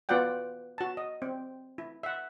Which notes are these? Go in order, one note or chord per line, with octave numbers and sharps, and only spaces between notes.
B3 F4 F#4 D5 F#5 G5
F#4 A5
D#5
C4
E4
E5 F#5